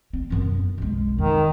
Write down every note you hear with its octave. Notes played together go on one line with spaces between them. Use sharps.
C4
F#2 B3
B1 G#3
F2 D#3